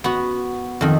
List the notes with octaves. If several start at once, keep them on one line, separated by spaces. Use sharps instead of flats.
B3 F#4
F2 D#3